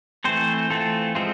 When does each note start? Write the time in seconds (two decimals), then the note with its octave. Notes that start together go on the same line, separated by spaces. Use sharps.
0.24 E3 A3 C4 A4 C5
0.70 E3 A3 C4 F4 A4
1.15 F3 G#3 C4 F4 A4